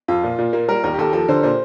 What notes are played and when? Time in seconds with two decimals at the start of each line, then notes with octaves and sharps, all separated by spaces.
0.08 F2 F4
0.23 A#2
0.38 A#2
0.53 A#3
0.68 G3 A#4
0.84 D#2 A#4
0.94 G4
0.98 D#2 A4
1.13 F3 A4
1.28 D3 C5
1.43 A#2 C5